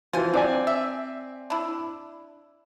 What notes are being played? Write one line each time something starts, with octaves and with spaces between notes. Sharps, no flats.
E3 F3 F4 C5 G#5
C4 D4 D5 G#5
E5
D4 E4